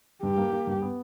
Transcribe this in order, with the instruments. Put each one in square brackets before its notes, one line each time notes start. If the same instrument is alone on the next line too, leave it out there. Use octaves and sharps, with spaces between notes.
[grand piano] G2 [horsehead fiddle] G4
[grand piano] A#3
A#3
G2
B3